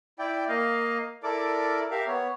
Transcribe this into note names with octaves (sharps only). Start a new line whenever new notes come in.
E4 D5 G5
A#3 D#5 F5
E4 A4 A#4 D5 D6
G4 A#4 E5 F5
B3 C#5